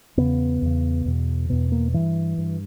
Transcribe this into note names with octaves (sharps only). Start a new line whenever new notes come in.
E2 C#3 B3
E2 C#3
E2 B2
E2 B2 B3
A#3
G2 E3
G2